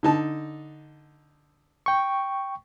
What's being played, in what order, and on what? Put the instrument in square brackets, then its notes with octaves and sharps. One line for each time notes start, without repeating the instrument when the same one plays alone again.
[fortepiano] D3 D#4 A5
[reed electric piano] G5 C#6